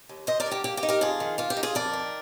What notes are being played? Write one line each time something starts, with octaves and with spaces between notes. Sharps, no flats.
D#2
D#2 C5 D#5
A#4 D5
D3
G4 A#4
A#3 G4
G4
D#4
G4 A#4
F2 F4 G#4
D#3
A#3 F4
G4
D#4
F4 G#4
F2 A#4 D5
D#3